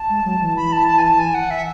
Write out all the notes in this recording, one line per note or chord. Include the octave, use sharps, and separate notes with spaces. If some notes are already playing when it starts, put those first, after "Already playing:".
Already playing: A5
G#3
F#3
E3
B5
A5
A5
G#5
A5
G#5
F#5
E5